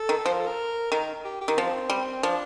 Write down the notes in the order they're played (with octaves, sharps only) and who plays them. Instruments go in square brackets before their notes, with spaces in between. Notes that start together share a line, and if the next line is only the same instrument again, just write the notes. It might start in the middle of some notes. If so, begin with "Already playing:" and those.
Already playing: [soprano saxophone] A4
[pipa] D#3
[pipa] F3 [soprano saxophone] C5
[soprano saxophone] A#4
A4
A#4
[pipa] D#3 [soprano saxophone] A#4
[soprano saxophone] G4
G4
[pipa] D#3
[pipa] F3 [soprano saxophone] C4
[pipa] G3
[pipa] F3 [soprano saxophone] D4